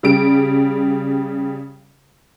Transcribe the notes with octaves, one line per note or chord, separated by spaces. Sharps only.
C#3 G3 D7